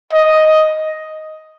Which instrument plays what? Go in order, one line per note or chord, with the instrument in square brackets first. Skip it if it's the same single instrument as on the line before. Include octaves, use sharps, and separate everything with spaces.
[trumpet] D#5